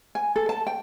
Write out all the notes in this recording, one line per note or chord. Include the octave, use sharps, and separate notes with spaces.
G#5
A4
A5
G5